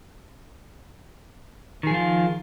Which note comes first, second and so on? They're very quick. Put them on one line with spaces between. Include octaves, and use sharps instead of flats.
D#3 G#4 F3 F4